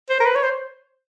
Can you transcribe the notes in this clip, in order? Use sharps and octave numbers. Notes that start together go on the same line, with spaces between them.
C5
A#4
B4
C#5
C5